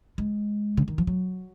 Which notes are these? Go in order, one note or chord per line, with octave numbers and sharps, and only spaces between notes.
G#3
C#3
D#3
F3
F#3